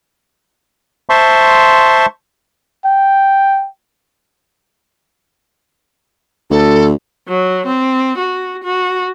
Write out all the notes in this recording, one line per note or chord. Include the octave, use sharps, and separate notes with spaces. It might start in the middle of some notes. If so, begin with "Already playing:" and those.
C5 E5 A5 C6 C#6
G5
D2 A4
F#3
C4
F#4
F#4